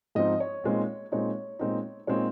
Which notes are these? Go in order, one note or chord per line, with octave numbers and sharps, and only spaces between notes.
G#2 F3 C4 D#4 D#5
C#5
A#2 G#3 C4 D#4
A#2 G#3 C4 D#4 C#5
A#2 G#3 C4 D#4
A#2 G#3 C4 D#4 C#5